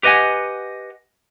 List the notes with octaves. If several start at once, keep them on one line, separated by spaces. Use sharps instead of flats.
G4 B4 D#5 F#5 G#5